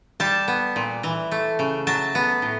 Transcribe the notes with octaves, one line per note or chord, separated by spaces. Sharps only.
G3 A5
B3
A#2
E3
A3
C#3
F#3 A5
B3
A2